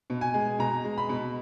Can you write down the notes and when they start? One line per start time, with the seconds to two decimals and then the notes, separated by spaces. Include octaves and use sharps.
0.10 B2
0.21 G#5
0.34 G#3
0.59 B2 A#5
0.85 G#3
0.98 B5
1.09 B2